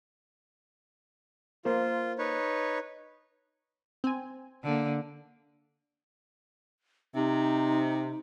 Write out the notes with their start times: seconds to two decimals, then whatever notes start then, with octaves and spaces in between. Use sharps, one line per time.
1.65 A#3 F4 A#4 C5
2.19 D#4 B4 C#5
4.04 C4 G#5
4.64 D3 A#3
7.15 C3 D#4